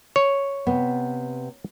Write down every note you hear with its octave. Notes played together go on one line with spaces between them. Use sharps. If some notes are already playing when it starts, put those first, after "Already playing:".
C#5
C3 B3